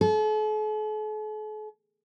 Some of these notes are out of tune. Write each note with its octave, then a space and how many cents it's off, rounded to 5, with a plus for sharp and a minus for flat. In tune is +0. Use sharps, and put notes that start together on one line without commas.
A4 -45